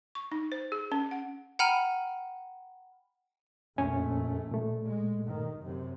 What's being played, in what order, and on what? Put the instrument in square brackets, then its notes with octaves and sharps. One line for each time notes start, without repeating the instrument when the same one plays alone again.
[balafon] C#6
D#4
C5
G#4
C#4
F#5
[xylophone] F#5 G5 A#5 B5 F6 D#7
[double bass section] A#1 A3 [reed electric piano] F2 C#4 G#5
[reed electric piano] A#2 A3
[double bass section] G#3
G2 D#3
F#2 C3